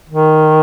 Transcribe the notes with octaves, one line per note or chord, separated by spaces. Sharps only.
D#3